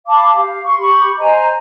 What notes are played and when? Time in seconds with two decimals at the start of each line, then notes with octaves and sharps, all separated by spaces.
0.07 F5 A5 B5 D6
0.35 G4 F5
0.64 C6 C#6
0.78 G4 B5 C#6
1.19 C5 D#5 G#5 A#5